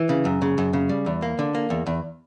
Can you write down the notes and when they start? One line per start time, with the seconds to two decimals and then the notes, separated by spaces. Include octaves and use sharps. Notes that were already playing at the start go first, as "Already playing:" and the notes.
Already playing: E3
0.09 C#3
0.25 F#2
0.42 C#3
0.58 F#2
0.73 C#3
0.89 G3
1.06 E2
1.22 A#3
1.39 D3
1.55 A#3
1.70 E2
1.86 E2